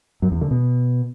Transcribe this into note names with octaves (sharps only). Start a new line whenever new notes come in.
F#2
E2
D3
B2